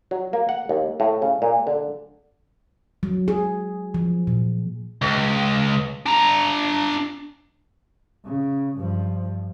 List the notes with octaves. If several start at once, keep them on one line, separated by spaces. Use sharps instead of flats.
F#3
A#3
F#5
D#2
A2
C#3
A#2
D3
F#3
G#4
F3
A#2
C#2
D4 A#5
C#3
G2 F3